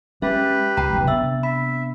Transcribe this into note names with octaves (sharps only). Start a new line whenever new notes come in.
G#3 C#4 G4 B4 E5
C#2 G5 A#5 B5
F1 B1
C3 B3 D4 E5 E6
E5 B5